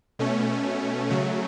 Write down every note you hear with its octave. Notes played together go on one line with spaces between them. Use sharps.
B2 A3 C#4
C#3 F#3 A3